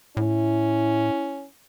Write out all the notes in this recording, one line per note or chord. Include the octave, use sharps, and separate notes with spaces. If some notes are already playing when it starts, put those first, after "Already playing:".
A2 C#4 E4